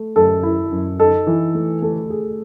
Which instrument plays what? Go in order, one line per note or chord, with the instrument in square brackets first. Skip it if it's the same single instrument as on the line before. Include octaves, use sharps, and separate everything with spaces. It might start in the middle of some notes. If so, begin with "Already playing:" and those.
Already playing: [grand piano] A3
[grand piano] F#2 [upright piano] A4
[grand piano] E4
F#2
[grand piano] D#4 [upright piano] A4
[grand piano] E3
A3
[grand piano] A3 [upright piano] A4
[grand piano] G#4